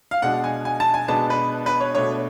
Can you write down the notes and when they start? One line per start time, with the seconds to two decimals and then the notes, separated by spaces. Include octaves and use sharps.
0.11 F5
0.22 B2 G#3 D4 F#5
0.44 G#5
0.65 G#5
0.80 A5
0.94 G#5
1.08 B2 G#3 B3 D4 A5
1.30 B4
1.66 B4
1.80 C#5
1.94 B2 A3 D4 C#5